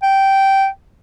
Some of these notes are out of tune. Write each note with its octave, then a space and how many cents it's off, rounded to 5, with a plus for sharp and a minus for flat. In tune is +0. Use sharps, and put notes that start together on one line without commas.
G5 -10